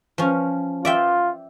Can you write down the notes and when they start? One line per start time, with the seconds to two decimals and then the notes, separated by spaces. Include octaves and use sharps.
0.18 F3 C#4
0.85 F4 D5 E5 G5